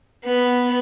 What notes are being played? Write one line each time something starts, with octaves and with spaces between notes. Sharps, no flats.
B3